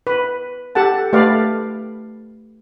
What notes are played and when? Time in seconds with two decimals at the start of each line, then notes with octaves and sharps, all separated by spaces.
0.07 B4
0.75 G4 A4 F#5 A5
1.13 A3 G4 B4 D5 F5